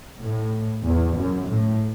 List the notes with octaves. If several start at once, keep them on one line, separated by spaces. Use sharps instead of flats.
A2
E2
F#2
A2